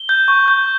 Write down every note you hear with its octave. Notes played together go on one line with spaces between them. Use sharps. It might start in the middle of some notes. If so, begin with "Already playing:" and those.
Already playing: G7
G6
C#6
G6